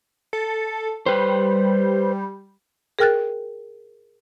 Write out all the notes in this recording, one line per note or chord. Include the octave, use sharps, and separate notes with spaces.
A4
G3 B4 C5
G#4 A#4 G5 F6 F#6 A6